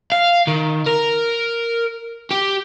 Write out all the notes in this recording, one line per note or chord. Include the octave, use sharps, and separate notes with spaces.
F5
D#3
A#4
G4